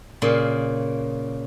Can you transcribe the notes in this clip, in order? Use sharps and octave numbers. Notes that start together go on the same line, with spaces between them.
A#2 C#3 C6